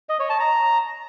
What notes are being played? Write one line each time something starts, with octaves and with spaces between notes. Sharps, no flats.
D#5
C#5
A5
A#5